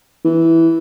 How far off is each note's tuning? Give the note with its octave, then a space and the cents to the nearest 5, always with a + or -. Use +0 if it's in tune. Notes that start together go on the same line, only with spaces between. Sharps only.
E3 -5